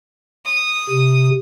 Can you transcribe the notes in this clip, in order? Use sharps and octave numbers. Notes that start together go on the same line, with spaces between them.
D#6
C3